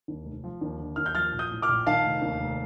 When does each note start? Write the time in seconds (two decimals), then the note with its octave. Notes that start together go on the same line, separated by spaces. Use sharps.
0.08 D#2
0.25 F1
0.44 F3
0.61 D#2
0.79 D3
0.96 D#2 F6
1.06 G6
1.15 F3 F6 A6
1.33 A#1
1.39 D#6 G6
1.51 A2
1.62 D6 F6
1.68 A#1
1.87 D#3 F5 A5
2.05 F1
2.22 D#2
2.40 F1